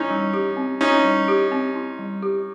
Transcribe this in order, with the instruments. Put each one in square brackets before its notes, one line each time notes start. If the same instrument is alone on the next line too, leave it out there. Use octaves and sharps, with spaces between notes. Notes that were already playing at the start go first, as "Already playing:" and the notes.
Already playing: [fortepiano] C#4 D#4 [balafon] E4
[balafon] G3
G4
C4
[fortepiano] C#4 D#4 [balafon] E4
[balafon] G3
G4
C4
E4
G3
G4